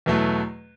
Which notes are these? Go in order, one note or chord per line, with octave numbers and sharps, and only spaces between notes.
E2 B2 F#3 A3